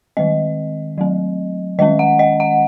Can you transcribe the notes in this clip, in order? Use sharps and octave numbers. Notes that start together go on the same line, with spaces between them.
D#3 G#3 C4 D#5
F#3 A3 C4
D#3 G#3 C#4 D#5
F#5
D#5
F#5